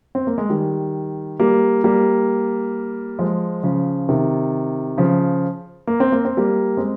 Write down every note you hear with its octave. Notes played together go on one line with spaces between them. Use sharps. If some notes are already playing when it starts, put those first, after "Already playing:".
C4
A#3
G#3
D#3 G3
G3 A#3
G3 A#3
F3 G#3
C#3 F3
C3 D#3
C#3 F3
A#3
C4
A#3
C4
G3 A#3
G#3 C4